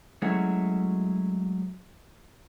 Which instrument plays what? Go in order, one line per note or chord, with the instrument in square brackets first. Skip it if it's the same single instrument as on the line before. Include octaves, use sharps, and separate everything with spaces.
[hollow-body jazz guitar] F#3 G#3 A3 C#4 E4 F#4